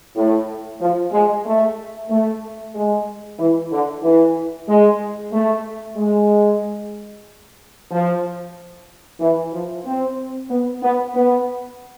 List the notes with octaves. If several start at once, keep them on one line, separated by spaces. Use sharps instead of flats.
A2
F3
G#3
A3
A3
G#3
E3
D3
E3
G#3
A3
G#3
F3
E3
F3
C4
B3
B3
B3